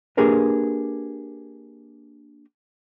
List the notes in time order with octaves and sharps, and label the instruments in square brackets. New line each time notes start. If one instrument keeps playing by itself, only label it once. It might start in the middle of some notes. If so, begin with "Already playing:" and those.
[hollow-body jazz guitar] A#3 D4 G4 G#4 A#4 B4